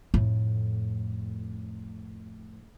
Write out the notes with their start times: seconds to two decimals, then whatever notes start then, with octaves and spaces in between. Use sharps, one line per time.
0.14 F2 A2